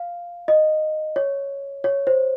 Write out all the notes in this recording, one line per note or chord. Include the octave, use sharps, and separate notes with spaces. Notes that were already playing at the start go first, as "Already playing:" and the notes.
Already playing: F5
D#5
C#5
C#5
C5